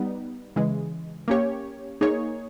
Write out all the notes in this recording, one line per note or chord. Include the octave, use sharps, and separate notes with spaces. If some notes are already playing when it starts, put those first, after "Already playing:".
Already playing: G3 B3 D#4
C#3 E3 G#3
A#3 C#4 G4 C#5
A#3 D#4 G#4 C#5